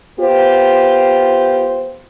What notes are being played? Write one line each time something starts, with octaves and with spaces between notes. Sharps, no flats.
B3 F4 G4 C5